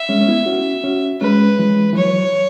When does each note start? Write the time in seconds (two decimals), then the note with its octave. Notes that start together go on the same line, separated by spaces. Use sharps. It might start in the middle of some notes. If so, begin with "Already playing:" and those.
Already playing: E5
0.09 G#3 C#4
0.21 C#4
0.27 B3 E4
0.46 C#4 F#4
0.84 C#4 F#4
1.21 G#3 C#4 B4
1.59 E3 G#3
1.93 E3
1.96 F#3 C#5